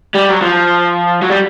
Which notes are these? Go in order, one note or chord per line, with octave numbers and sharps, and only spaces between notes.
G3
F#3
F3
F#3
G3